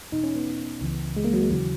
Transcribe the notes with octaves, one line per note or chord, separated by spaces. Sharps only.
E2 B2 D#4
C#4
B3
C#2 C#3 E3
G#3
A#3
F#3
G#3
D#2 C#3 E3 F#3